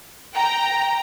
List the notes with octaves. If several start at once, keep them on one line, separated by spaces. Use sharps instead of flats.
G5 A#5